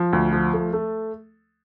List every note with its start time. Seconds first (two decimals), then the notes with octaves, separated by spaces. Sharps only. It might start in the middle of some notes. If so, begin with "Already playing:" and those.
Already playing: F3
0.13 D2
0.33 F3
0.53 A3
0.73 A3